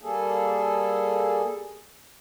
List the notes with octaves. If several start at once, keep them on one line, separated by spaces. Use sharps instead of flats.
G3 A#3 G#4 A4